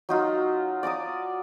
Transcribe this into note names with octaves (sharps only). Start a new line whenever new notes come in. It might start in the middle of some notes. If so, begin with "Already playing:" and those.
F#3 D#4 F4
D5 A#5 D6 D#6